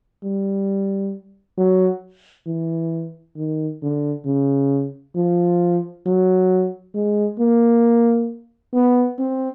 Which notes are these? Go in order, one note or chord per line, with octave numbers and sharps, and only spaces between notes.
G3
F#3
E3
D#3
D3
C#3
F3
F#3
G#3
A#3
B3
C4